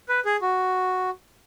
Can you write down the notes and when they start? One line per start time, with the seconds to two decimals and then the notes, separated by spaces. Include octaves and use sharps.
0.09 B4
0.25 G#4
0.42 F#4